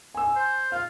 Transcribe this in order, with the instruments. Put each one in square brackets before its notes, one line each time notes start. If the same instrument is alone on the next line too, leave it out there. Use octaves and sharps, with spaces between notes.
[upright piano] G#5 E6
[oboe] C5
[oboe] F4 [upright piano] F5